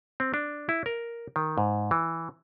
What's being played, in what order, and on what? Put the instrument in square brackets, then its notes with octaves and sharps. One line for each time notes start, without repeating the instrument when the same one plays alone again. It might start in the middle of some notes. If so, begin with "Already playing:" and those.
[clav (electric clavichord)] C4
D4
E4
A#4
D#3
G#2
E3